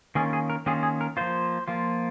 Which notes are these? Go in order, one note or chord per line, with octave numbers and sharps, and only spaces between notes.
D#3 A#3 C#4 F4 G#4
G#4
A#4
D#3 A#3 C#4 F4 G#4
G#4
A#4
F3 A#3 F4 C5
F3 A#3 F4